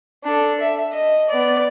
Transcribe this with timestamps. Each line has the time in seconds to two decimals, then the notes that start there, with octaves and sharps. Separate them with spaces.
0.24 D4 A4
0.60 E5
0.92 D#5
1.29 B3 D5